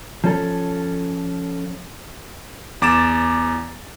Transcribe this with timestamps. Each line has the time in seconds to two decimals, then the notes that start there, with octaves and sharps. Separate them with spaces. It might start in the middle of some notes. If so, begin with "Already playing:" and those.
0.24 F3 C#4 A4
2.82 E2 D6 A6 E7